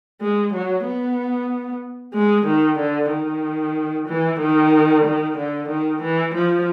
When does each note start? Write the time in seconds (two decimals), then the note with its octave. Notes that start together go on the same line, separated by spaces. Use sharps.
0.21 G#3
0.54 F#3
0.85 B3
2.14 G#3
2.46 D#3
2.78 D3
3.12 D#3
4.08 E3
4.40 D#3
5.05 D#3
5.37 D3
5.69 D#3
6.02 E3
6.34 F3